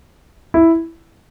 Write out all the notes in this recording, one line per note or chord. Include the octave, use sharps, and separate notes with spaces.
E4